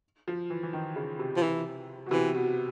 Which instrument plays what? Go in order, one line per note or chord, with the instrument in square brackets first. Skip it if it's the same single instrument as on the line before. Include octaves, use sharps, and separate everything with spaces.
[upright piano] F3
E3
E3
D#3
C#3
C3
[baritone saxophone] F3
E3
[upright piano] B2
[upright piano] C3 [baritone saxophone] E3
[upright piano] B2